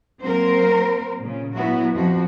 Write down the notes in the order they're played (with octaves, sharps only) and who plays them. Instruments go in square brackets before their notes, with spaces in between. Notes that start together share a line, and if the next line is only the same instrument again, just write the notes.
[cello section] F#3 A#3 C4 A#4 C5
A#2 C#3
F#3 B3 E4 F#4
F2 F3 F#4